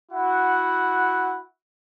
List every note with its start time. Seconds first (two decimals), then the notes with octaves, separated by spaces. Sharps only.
0.11 E4 F#4 F#5